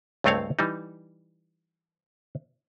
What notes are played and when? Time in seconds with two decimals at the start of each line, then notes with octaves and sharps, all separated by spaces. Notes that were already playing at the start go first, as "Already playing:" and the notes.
0.24 C#2 G2 A3 C4 C#5 F5
0.59 E3 G3 D#4